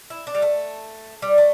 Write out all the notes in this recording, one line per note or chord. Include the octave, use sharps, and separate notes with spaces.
E4
D4
G3
A3
G3
A3